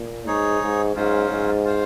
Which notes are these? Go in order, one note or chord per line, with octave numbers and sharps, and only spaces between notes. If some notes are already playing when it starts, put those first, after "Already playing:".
Already playing: A#2
G#2 D#4 G#4 C#5
G#2
G#2 F#3 C#4 F4 C5
G#2
F4 C5 F5